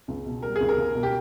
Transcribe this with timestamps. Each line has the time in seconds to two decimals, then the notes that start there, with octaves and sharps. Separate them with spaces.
0.08 C#2
0.26 B2
0.43 G3 A#4
0.56 G#4
0.61 C#2
0.69 A#4
0.78 C#2
0.95 B2
1.03 G4